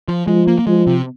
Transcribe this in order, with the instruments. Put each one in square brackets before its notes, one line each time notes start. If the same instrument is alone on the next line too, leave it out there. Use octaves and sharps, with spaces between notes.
[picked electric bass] F3
[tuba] F3 [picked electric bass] G#3
[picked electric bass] A#3
A#3
[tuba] F3 [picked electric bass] G#3
[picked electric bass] C3